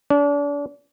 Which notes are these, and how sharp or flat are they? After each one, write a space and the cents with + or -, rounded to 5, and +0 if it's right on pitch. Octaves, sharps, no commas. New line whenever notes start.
D4 -35